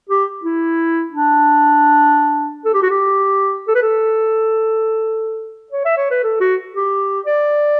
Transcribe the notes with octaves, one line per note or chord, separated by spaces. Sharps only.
G4
E4
D4
A4
G4
F#4
G4
A4
B4
A4
C#5
E5
C#5
B4
A4
F#4
G4
D5